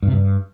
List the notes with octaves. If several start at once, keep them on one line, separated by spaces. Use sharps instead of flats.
G2
C3
G2